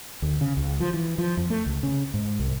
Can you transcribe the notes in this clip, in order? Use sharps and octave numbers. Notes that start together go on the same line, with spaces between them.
D2
C#3
C#2
F3
E3
F3
F2
A3
C#2
C#3
G#2
C2